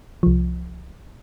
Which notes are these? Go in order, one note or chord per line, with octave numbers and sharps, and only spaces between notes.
C2 F3